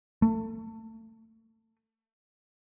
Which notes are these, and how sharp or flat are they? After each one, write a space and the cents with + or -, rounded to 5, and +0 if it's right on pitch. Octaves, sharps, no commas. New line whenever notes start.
A3 +30